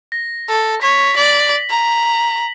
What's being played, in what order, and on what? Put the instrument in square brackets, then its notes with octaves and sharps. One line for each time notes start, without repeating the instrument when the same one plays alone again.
[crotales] A#6
[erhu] A4
[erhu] C#5 [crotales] B6
[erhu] D5 [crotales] F#7
[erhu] A#5